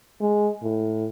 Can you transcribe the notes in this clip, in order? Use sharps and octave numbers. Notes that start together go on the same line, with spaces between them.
G#3
A2